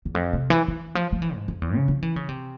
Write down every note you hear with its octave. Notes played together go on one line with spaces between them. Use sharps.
E2
F2
C3
E3
E3
F3
F3
E3
G#2
F2
E2
C#3
F3
E3
C#3
C3